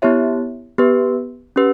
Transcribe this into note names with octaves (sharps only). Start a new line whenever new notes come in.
B3 E4 G4 C#5 E5
B3 G4 B4
C#4 G4 B4